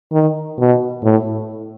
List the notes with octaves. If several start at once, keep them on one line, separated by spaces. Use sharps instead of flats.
D#3
B2
A2